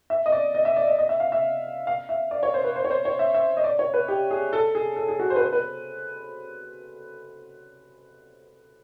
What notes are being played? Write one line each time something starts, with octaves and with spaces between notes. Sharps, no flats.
E5
D#5
D5
D#5
E5
D5
D#5
D#5
E5
F5
E5
F5
E5
D5
C#5
C5
B4
C5
C#5
C5
C#5
E5
E5
D#5
D5
C#5
B4
G4
G#4
A4
G#4
A4
G#4
F#4
C5
B4
C5
B4